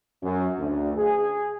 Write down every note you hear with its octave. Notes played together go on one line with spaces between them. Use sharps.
F#2
D2
G#4